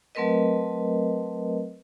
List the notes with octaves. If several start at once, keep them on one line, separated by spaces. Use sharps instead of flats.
F#3 A3 C4 A#4 B4 D#5